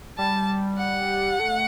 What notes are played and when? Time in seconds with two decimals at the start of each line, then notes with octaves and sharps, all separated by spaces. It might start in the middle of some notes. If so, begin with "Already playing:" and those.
0.18 G3 A5
0.78 F#5
1.40 A3